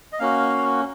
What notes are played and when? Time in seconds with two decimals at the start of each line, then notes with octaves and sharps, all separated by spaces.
0.13 D#5
0.19 A#3 C#4 F#4 F5